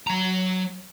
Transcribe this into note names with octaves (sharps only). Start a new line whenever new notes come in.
F#3 A#5